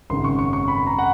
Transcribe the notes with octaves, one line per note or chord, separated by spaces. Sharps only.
G#1 F#2 C#3 C6
C#6
C#6
C#6
B5
A#5
F#5